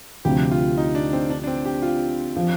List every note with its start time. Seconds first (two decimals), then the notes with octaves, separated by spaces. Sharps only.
0.25 D2 C3 F3 G4
0.51 F4
0.77 D#4
0.95 D4
1.13 C4
1.30 D4
1.43 D4
1.47 C4
1.65 G4
1.82 F4
2.37 F3